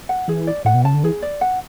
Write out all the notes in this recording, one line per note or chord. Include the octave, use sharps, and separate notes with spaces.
F#5
E3 G#4
D5
A2 F#5
B2
C#3 A5
D3
E3 G#4
D5
F#5